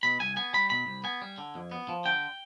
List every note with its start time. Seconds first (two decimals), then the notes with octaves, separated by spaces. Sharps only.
0.03 B2 B5
0.20 C2 G#5
0.36 B3 G#5
0.53 G3 B5
0.70 B2 B5
0.87 C2
1.04 B3 G#5
1.22 G3
1.38 D3
1.55 F2
1.71 B3
1.89 F3
2.05 D3 G5